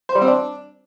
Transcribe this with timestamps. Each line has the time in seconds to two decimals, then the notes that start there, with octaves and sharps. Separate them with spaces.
0.09 C5
0.15 G3
0.22 C4
0.28 D4